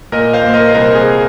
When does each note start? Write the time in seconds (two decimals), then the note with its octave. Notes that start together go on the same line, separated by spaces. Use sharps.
0.12 A#2 A#4 D#5
0.33 C5 F5
0.44 A#3
0.54 A#4 D#5
0.69 C5
0.75 C2 A#4
0.95 G#4